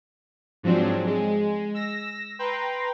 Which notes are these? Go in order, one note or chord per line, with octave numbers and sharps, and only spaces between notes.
G#2 F3 F#3 C4 D4
G#3
E6 A#6
B4 G5 A#5 C6